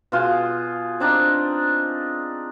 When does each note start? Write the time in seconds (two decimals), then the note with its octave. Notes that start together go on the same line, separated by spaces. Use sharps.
0.12 B2 F4 G#4
1.00 C4 D4 D#4